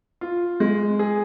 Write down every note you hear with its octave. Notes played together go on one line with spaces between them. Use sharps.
F4
G#3
G#4